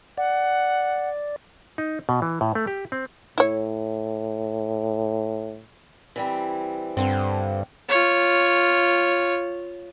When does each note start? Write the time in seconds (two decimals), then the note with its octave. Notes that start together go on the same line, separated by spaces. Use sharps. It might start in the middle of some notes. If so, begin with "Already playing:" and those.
0.18 D5 F#5
1.78 D#4
2.09 B2
2.22 E3
2.41 A2
2.55 A3
2.67 G4
2.92 C4
3.38 A2 E4 C#5
6.16 E3 G3 C4
6.97 G2 D3 C4
7.89 F4 C#5